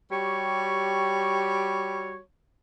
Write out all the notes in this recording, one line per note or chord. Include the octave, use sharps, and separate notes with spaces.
G3 F#4 G4 C#5